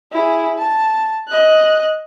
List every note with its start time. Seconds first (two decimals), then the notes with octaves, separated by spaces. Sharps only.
0.12 E4 G#4
0.58 A5
1.28 D#5 F#6